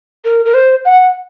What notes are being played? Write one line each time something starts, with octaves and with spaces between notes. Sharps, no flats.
A#4
A#4
C5
F#5